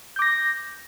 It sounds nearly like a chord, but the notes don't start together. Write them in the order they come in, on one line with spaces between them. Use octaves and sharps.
G6 D6 A#6